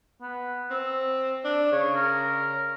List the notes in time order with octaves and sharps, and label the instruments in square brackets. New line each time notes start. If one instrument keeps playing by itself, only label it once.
[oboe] B3
[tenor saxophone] C4 [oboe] E6
[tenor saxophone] D4
[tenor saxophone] C#3 [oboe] C#5
[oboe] A#4